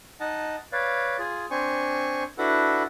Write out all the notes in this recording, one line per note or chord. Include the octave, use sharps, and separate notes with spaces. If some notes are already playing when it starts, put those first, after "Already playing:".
D#4 D#5 F#5 A5
B4 C#5 D5 F5
F4 G#4
C4 D4 C5 G#5 C#6
D4 E4 F#4 A4 B4 F#5